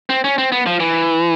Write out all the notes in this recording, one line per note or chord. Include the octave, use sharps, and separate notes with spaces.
C4
C#4
C4
B3
F3
E3